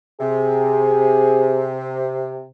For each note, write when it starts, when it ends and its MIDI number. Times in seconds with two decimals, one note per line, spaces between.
0.20 2.46 48
0.20 1.75 68